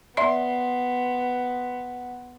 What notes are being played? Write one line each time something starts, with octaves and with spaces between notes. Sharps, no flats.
B3 D5 E5 C6